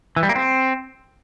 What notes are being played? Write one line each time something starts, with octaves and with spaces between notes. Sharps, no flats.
E3
G3
A#3
C4